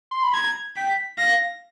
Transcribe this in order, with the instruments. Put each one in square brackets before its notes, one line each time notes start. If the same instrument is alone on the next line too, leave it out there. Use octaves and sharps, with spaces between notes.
[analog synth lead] C6
B5
[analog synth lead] A#5 [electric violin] G#6
[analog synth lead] G5 [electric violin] B6
[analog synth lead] F5 [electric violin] A#6